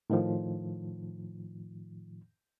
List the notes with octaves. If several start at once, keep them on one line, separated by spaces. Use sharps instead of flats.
A2 D#3 F3